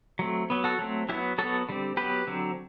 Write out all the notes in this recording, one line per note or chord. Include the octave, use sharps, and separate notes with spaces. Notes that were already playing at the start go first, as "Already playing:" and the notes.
F#3 A3 C4
F#3 B3
F#4 A4
F#3 A3 C4
F#3 B3 E4 G4
F#3 B3 F#4 A4
D3 G3 C4
F#3 B3 G4 B4
D3 F#3 C4